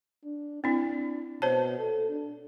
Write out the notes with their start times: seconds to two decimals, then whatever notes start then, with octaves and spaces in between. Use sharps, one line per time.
0.24 D4
0.64 C4 D4 E4
1.42 B2 C5 C#5 A5
1.78 A4
2.09 D4